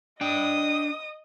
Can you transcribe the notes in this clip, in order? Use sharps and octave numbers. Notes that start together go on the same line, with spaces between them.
D4 D#5 G5 D#6